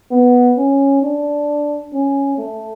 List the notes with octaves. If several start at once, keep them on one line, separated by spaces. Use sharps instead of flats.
B3
C#4
D4
C#4
A3